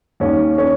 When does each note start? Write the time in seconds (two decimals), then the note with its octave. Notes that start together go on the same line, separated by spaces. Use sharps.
0.20 D#2 C#4
0.58 C#4